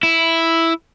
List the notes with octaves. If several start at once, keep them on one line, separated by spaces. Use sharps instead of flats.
E4